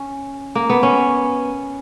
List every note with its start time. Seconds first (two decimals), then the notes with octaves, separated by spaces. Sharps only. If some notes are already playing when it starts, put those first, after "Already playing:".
Already playing: C#4
0.55 A#3
0.70 B3
0.83 C#4